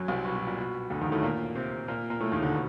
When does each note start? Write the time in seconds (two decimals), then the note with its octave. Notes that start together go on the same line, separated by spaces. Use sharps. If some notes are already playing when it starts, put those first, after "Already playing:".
Already playing: F#2 F#3
0.08 C2 C3
0.25 B2
0.35 B2
0.47 A#2
0.58 B2
0.90 D2 D3
1.01 D#2 D#3
1.12 A2 A3
1.23 A#2 A#3
1.55 C3 C4
1.88 A#2 A#3
2.10 A#2 A#3
2.20 A2 A3
2.32 D#2 D#3
2.42 D2 D3
2.54 B2